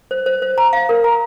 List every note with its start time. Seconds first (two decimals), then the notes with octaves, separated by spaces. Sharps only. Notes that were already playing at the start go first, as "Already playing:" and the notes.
0.11 C5
0.26 C5
0.42 C5
0.58 A#5
0.73 F5
0.89 A#4
1.04 A#5